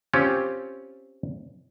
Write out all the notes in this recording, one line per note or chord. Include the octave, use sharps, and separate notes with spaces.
C4 C#4 F4 G4